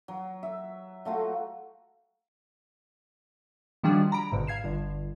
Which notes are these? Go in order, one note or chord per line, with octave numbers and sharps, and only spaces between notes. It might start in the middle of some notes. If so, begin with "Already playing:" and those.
F#3
E5
F#3 A3 F4 F#4
D#3 F3 G3 D4 F#4 G#4
A#5 B5 D7
G#1 G#2 B2 D3
F5 G#6 C7 E7
G1 D3